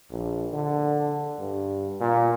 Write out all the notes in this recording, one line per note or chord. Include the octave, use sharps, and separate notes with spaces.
A#1
D3
G2
A#2